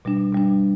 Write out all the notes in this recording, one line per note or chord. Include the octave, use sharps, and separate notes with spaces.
B2 G3 D4
B2 G3 D4